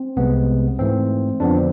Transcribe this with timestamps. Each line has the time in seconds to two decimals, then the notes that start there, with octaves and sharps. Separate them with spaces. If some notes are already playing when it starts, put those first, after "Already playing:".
Already playing: C4
0.16 C2 C3 G#3 B3
0.79 G#2 E3 A3 C4
1.40 F2 D3 F3 B3 D4
1.55 C4